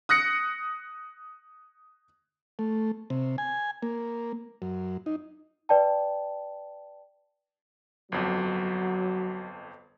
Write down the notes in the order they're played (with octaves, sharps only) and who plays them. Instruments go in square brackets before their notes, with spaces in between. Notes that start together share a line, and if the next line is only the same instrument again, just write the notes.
[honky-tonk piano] D#6 F#6 A#6 C#7
[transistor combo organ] A3
C3
G#5
A#3
F#2
D#4
[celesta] B4 D5 G5 A5
[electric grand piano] G1 F2 [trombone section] F#3